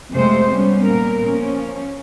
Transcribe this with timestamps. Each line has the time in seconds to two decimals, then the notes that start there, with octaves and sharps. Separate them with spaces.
0.10 F2 C3 G#3 A3 C5
0.50 G3 B3 C#4
0.84 A#2 A#4
1.22 F3 A#3 C#4